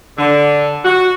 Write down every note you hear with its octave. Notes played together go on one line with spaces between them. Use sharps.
D3
F#4